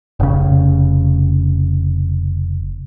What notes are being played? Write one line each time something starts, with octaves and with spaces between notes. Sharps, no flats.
F1 C#3